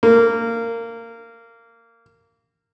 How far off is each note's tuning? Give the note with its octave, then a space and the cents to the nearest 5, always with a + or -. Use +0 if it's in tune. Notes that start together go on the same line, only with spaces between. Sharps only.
A#3 -20